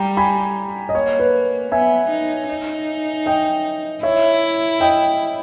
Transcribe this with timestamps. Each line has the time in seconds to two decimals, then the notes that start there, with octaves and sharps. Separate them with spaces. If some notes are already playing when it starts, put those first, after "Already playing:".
Already playing: G3 G5 A#5
0.17 G#5 B5
0.89 D#5
0.94 A#3 C#5
1.20 B4
1.71 B3 E5 G#5
2.10 D#4
2.49 D#4
3.26 D#5 G5
4.03 E4 C#5 E5
4.81 D#5 G5